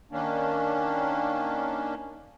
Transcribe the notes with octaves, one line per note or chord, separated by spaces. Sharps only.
D#3 A#3 C#4 D4